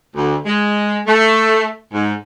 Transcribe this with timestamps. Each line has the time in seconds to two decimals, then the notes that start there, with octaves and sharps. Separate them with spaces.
0.16 D2
0.46 G#3
1.07 A3
1.93 G#2